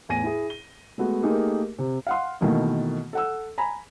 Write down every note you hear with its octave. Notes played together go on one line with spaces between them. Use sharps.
E2 A2 G#5 A#6 D#7
E4 G#4
G7
G#3 A3 B3 F#4
A3 A#3 D#4 G4 G#4 A#4
C3
F5 F#5 C6
B2 D#3 E3 A3 A#3
A4 F#5 E6
G#5 A#5 B5